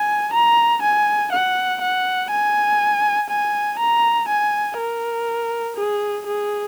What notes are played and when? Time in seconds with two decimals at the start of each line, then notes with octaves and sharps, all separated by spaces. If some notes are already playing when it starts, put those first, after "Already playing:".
Already playing: G#5
0.33 A#5
0.82 G#5
1.32 F#5
1.82 F#5
2.31 G#5
3.30 G#5
3.79 A#5
4.28 G#5
4.78 A#4
5.77 G#4
6.26 G#4